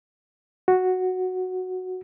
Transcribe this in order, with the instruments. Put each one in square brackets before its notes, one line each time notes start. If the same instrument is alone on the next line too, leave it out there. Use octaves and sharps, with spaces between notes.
[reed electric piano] F#4